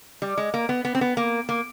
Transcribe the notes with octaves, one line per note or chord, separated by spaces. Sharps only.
G3
G#3
A#3
B3
B3
C4
B3
A#3
A#3